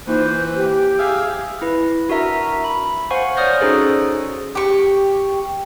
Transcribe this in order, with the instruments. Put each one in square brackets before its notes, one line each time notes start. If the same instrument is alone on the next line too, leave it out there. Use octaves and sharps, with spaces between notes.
[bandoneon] E3 B4 [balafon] A#3 D#4 F4 [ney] C5
[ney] G4
[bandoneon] G#4 E5 F5
[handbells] E4 B4
D4 F#4 A#4 E5 A#5
B5
C5 F5 F#5 G#5 C#6
C#5 D5 D#6 F6 G6 A#6
C#4 D#4 F#4 G#4 A4 C5
[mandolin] G4 C#6